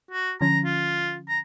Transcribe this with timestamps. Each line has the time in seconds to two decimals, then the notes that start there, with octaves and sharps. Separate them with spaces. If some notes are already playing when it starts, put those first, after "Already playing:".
0.11 F#4
0.41 D3 F3 C#4 A#5
0.65 F4
1.29 A#5